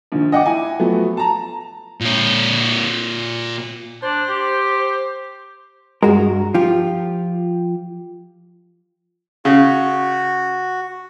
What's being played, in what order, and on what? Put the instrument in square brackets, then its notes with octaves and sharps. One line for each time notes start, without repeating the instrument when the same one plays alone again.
[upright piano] A#1 D#3
D#5 F#5 G5 D6
E4 G#5
F3 F#3 A3 B3
A5 A#5
[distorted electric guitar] A#2 C#5
[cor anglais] D4 [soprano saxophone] C5
[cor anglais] G4
[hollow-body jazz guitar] G2 F#4 A#4 [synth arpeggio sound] G#3
[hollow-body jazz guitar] F3 F4 G4
[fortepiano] C#3 [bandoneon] F#4